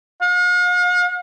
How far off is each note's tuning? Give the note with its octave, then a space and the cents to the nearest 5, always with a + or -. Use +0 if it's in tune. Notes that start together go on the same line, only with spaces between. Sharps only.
F5 +45